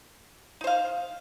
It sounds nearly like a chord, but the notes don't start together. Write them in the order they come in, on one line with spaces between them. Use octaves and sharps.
D#4 C5 F5